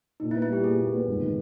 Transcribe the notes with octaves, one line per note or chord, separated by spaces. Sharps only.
A#2 D#4
E4
B3
E4
G3 G4
A#2 G#4
A#2
B3
G#1
D#3